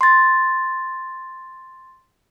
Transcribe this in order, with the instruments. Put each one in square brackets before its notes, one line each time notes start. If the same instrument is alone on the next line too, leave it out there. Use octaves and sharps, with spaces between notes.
[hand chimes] C6 A6